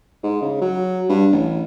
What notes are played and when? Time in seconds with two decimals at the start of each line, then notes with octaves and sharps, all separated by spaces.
0.23 G#2
0.42 C#3
0.61 F#3
1.09 G2
1.32 A1